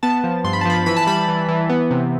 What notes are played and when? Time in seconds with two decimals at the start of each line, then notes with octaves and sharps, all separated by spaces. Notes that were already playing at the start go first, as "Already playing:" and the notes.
0.03 B3 A5
0.24 F3
0.44 G2 C6
0.53 B5
0.61 A5
0.65 F3 B5
0.86 E3 B5
0.96 A5
1.07 G3 B5
1.28 E3
1.48 E3
1.69 B3
1.91 C3